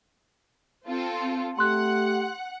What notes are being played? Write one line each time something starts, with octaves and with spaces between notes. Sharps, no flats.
C4 F4 A4
A3 G4 F#5 C6 F#6